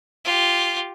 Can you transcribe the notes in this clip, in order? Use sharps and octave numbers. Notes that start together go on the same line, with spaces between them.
F4 G4